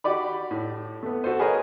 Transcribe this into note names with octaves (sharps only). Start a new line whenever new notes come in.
F#4 G4 D5 B5
A2
A3 B3
F#4 A4 C5
G#4 A#4 B4 C#5 D#5